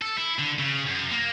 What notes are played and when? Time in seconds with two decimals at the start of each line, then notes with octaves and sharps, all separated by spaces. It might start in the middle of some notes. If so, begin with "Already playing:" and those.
0.02 A4
0.18 E4
0.39 D3
0.59 C#3
0.87 F#2
1.11 A#3